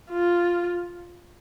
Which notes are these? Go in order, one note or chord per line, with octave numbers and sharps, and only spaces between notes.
F4